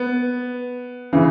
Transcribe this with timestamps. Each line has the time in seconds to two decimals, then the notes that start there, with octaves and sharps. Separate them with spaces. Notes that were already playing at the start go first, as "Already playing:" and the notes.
Already playing: B3
1.13 C#3 E3